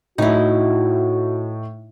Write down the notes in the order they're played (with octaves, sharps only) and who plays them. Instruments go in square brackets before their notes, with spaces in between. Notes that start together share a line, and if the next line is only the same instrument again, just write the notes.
[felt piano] A2 [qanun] D#4 E4 [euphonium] F#4